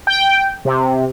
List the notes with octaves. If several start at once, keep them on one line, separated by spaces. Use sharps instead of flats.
G5
C3